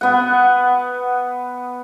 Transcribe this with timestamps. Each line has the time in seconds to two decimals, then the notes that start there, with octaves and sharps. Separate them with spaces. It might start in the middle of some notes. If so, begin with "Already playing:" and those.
0.01 B3 F#5